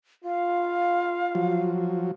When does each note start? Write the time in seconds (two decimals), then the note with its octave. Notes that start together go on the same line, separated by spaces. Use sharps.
0.24 F4 F5
1.35 F3 F#3